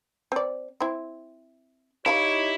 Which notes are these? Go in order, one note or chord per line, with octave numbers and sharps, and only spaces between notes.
C4 D5
C4 E4
D#4 E4 G4 C#5 E5 F5 B5